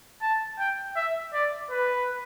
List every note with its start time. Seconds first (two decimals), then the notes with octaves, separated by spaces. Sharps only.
0.22 A5
0.59 G5
0.96 E5
1.33 D5
1.71 B4